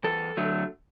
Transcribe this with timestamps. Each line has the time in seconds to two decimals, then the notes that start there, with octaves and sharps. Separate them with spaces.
0.04 E2 A4
0.37 D3 F#3 A3